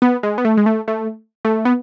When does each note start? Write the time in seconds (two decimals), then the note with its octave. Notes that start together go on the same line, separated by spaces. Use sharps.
0.02 B3
0.23 G#3
0.38 B3
0.45 A3
0.57 G#3
0.66 A3
0.88 A3
1.45 A3
1.65 B3